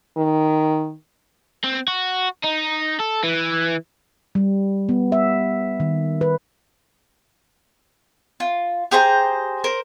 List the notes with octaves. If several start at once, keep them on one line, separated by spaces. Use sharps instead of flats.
D#3
C4
F#4
D#4
A4
E3
G3
B3
E5
D#3
B4
F4
G4 G#4 C5 A#5
A#4 C5